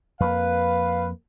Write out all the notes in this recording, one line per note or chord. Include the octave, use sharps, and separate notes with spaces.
F2 A#3 B4 F5